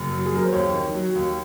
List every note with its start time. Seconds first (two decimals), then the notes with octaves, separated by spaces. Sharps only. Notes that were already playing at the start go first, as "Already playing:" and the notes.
Already playing: F#1
0.10 F#3
0.26 G#4
0.32 F#2 A#4
0.44 C5
0.52 D#2 C#5
0.73 D#3
0.94 F#3
1.15 D#2